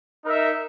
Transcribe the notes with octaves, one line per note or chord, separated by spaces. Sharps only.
D#4 A#4 E5